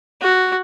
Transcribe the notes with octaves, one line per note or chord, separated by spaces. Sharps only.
F#4